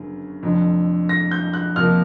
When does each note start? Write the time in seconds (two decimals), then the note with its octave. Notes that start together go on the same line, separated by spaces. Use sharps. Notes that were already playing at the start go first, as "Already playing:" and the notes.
Already playing: G1 F#2 C#3
0.43 F1 F2 D3
1.09 A#6
1.31 G6
1.53 F#6
1.76 F2 C3 F3 A#3 F6